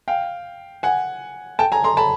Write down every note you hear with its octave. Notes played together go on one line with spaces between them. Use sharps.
F5 G5
F#5 G#5
G5 A5
G#5 A#5
A#5 C6
A5 B5